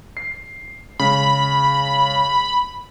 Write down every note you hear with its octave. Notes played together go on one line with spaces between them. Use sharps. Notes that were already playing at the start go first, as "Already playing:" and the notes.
C7
C#3 G#3 B5